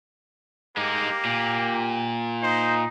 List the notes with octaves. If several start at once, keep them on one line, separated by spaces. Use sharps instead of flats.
G#3 A#3 D#4 G4
A#2
D#4 C5